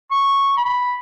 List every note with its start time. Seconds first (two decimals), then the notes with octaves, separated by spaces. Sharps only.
0.11 C#6
0.57 B5